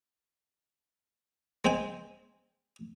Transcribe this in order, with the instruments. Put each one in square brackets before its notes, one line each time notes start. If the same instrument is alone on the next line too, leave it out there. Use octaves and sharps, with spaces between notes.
[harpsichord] G#3 C4 G5 G#5